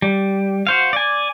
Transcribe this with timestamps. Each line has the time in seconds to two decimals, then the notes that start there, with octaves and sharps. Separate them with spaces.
0.02 G3
0.67 F#4 C5 F5
0.93 D5 G#5